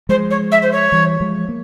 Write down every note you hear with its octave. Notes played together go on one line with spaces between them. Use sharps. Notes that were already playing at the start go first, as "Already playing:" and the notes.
F3 G#3 C5
C#5
E5
C5
C#5
E3 G3
F3 G#3
A#3